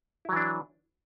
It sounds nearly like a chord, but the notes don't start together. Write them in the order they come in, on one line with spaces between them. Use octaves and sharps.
E4 F#3 E3 D4